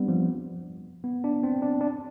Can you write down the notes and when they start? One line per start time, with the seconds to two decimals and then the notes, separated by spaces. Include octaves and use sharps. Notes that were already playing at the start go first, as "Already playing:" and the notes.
Already playing: G3 B3 C4 D4
0.08 F3
1.04 B3
1.24 D4
1.43 C4
1.62 D4
1.81 D4